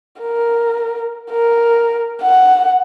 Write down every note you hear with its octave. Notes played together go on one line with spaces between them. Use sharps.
A#4
A#4
F#5